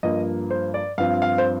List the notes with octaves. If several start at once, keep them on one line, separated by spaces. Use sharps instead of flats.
G2 F3 A#3 D#5
C5
D5
G2 F3 C4 F5
F5
C5